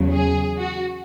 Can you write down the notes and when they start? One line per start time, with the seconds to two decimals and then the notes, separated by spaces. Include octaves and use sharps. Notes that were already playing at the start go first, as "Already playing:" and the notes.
Already playing: E2 C#3 F#3
0.11 G#4
0.58 F#4